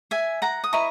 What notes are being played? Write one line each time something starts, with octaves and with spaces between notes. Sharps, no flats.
E5 G#5
F#5 A#5
D#6
E4 B4 D#5 A#5 C#6